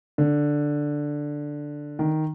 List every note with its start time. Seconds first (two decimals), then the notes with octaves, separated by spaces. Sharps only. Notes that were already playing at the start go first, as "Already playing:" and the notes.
0.18 D3
1.99 D#3